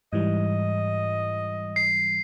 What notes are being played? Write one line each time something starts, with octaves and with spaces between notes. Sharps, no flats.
G#2 E3 G3 D#5
C7